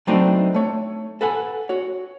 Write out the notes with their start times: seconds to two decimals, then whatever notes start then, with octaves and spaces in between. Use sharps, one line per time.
0.07 F#3 A3 C4 D4 D#4 B4
0.54 A3 C#5
1.21 A4 B4 F#5 G#5
1.69 F#4 C#5